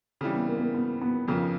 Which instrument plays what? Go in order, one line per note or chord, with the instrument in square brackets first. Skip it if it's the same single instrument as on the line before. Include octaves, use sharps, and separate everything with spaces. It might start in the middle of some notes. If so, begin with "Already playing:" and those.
[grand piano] C#3 E3 G3 [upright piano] C4
[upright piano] B3
A#3
B3
A#3
B3
B3
[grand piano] F2 C#3 F3 A#3